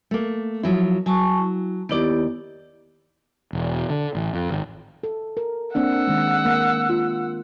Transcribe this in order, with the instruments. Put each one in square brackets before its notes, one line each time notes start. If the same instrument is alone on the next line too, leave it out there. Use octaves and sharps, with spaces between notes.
[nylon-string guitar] A3 A#3
F3 F#3 E4
[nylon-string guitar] F#3 [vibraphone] G#5 A5 C#6
[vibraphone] E4
[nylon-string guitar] D#2 D5 [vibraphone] B3 E4 G4
[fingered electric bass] E1
D3
A1
F2
G#1
[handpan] A4
A#4
[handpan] A#3 C4 D4 [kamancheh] F#5 E6
[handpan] D#3 G#3
A#3
F4